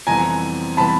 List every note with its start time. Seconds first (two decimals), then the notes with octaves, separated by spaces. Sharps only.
0.07 F2 C3 E3 G3 B3 G#5 A#5
0.77 C3 E3 G3 B3 A5 B5